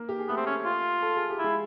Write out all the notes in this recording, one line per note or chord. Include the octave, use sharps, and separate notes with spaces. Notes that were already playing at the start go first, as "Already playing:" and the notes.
Already playing: A#3 A#4
G4
G#4
A3 B3 A4
C4
C#4
F4
A4
G#4
G4
E4
G#3 G#4